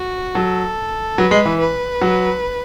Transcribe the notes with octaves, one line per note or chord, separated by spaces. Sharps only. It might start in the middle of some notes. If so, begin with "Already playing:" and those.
Already playing: F#4
F#3 A4
F#3 B4
G#3
E3
B4
F#3